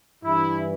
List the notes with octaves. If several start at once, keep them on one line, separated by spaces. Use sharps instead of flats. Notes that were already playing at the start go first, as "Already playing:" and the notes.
G2 E3 E4